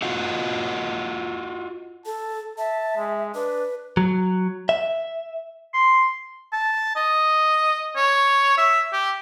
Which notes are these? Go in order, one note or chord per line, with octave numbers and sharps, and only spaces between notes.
F4 F#4 D#5 F5 F#5
A4 A5
E5 A5
G#3
D4 B4
F#3
E5
C6
A5
D#5
C#5
E5
G4